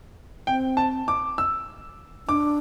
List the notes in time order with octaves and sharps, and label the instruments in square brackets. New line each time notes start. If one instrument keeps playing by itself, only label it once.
[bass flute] C4 [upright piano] G5
[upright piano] A5
D6
E6
[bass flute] D4 [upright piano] D6